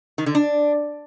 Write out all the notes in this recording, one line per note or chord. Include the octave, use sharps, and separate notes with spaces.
D#3
D3
D4